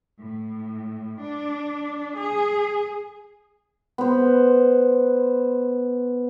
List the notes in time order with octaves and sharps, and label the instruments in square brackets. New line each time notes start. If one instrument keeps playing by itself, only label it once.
[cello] A2
D4
G#4
[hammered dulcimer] B3 C5